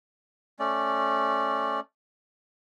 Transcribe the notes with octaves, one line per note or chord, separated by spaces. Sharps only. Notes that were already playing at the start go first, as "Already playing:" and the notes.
A3 C#4 D5